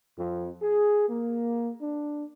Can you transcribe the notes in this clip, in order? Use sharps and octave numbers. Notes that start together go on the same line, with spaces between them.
F2
G#4
A#3
D4